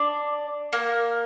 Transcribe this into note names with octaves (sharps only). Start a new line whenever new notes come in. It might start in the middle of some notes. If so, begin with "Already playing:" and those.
Already playing: D4 D5
A#3 A#4